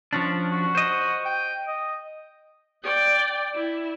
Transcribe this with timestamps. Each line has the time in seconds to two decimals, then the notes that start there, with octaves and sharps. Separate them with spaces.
0.13 F3 C#4 D4
0.51 F#4
0.75 C5 D#5
1.25 G5
1.67 D#5
2.83 D5 G5
3.55 E4